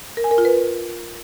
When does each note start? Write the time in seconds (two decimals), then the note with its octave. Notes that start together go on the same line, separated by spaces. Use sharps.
0.17 A#4
0.24 G#5
0.31 A#4
0.38 F4
0.45 B4